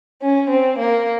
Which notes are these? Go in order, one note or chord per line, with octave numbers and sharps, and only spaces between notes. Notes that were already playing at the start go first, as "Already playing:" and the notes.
C#4
C4
A#3